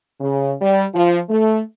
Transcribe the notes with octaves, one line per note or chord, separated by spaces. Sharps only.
C#3
G3
F3
A3